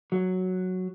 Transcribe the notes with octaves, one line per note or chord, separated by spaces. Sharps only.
F#3